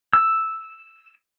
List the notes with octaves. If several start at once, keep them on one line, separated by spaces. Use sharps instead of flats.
E6